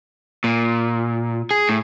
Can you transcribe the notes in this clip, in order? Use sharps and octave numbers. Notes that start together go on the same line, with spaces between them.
A#2
G#4
A2